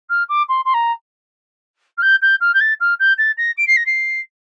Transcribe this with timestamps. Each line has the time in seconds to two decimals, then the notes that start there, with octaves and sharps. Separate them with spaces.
0.09 F6
0.29 D6
0.48 C6
0.65 C6
0.74 A#5
1.97 F6
2.02 G6
2.22 G6
2.40 F6
2.54 G6
2.60 A6
2.80 F6
2.99 G6
3.18 A6
3.37 A#6
3.57 D7
3.67 C7
3.76 A#6
3.86 C7